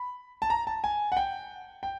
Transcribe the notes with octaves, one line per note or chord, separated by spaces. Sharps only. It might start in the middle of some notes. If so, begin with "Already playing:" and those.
Already playing: B5
A5
A#5
A5
G#5
F#5
G5
G5